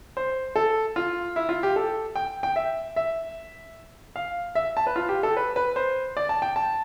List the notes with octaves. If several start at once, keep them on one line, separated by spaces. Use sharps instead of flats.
C5
A4
F4
E4
F4
G4
A4
G5
G5
E5
E5
F5
E5
A5
B4
F4
G4
A4
B4
B4
C5
D5
A5
G5
A5